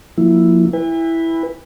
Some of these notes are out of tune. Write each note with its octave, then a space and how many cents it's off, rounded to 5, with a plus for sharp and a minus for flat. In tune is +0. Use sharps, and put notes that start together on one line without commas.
F3 +30 A#3 +0 E4 +0
E4 +0 B4 +0 G#5 -45